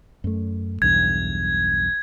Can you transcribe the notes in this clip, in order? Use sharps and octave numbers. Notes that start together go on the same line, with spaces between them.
F#2 A3
B1 E2 G2 G#6